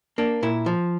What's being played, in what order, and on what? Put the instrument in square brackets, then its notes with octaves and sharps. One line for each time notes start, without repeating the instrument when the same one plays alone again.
[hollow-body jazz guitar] A#3 D4
A#2 E4
F3